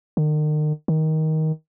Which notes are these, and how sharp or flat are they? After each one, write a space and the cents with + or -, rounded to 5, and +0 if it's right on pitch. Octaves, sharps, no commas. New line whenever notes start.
D#3 -40
D#3 +15